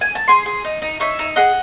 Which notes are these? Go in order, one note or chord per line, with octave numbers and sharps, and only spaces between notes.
G#5
A5
G#4 G#5 C6
G#4
D#4
D#4
D#4 C#5 E5
D#4
G#4 D#5 F#5